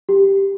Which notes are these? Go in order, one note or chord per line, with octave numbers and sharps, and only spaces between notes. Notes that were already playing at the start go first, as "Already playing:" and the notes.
G4